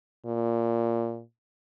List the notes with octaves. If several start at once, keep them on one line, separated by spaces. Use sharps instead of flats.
A#2